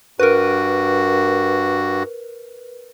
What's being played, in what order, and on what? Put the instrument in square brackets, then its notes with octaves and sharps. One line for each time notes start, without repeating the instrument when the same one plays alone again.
[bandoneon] G2 F#4 [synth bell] A#4 B4